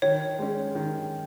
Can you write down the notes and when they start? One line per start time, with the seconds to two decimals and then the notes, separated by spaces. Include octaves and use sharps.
0.02 D#3 C#5
0.39 G#3 C#4
0.75 D#3